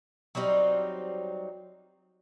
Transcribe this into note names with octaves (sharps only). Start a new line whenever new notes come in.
F#3 G3 C4 D#4